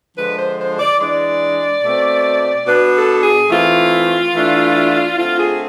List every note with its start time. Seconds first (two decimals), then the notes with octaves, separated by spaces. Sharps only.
0.16 D3 F3 G#3 D4 B4
0.37 C5
0.58 C5
0.79 D5
0.99 E3 G#3 D4 D5
1.83 B2 A3 C4
2.67 B2 B3 D4 B4
2.95 A4
3.22 G#4
3.50 E3 A3 C4 F4
4.34 E3 A3 D4
5.17 D3 A3 C4 F4
5.39 G#4